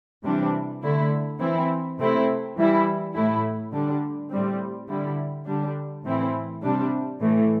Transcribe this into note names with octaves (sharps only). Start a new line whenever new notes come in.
C3 E3 G3 D4
D3 A3 E4
E3 C4 E4
C3 A3 C4 E4
E3 G3 E4
A2 A3 E4
D3 G3 D4
A2 G3 C4
D3 G3 E4
D3 G3 D4
A2 E3 C4 E4
C3 G3 D4
A2 E3 A3